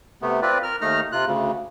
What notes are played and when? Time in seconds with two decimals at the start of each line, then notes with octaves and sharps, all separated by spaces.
0.22 C3 A3 B3
0.42 C4 F4 B4 D5
0.63 A#4 F6
0.81 D#2 A3 D#4 A#5 F6
1.12 C3 F4 F#6
1.26 D2 C#3